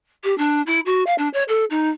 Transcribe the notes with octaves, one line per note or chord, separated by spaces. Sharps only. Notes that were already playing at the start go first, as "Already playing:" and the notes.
G4
D4
E4
F#4
F5
D4
C#5
A4
D#4